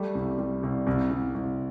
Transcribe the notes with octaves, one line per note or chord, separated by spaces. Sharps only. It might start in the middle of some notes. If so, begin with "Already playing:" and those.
Already playing: G3 A3
C2
G3
C2
C2
C2
C2